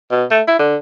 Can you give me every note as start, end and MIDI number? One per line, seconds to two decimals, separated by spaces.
0.11 0.25 47
0.31 0.42 57
0.47 0.57 64
0.59 0.76 50